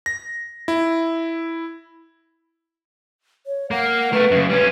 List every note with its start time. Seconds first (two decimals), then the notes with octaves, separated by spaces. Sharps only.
0.06 A#6
0.68 E4
3.46 C#5
3.71 A#3 A#4 F#5
4.13 A3 A#4 B4
4.31 F#2 C#3
4.49 G3 C#4 B4